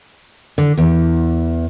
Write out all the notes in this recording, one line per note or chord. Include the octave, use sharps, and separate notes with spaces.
D3
E2